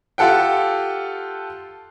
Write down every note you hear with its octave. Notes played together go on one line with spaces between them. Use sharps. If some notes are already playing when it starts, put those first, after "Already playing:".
F4 G4 A4 F#5 G5